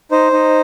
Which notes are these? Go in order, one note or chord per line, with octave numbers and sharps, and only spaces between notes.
D#4 C5
D#4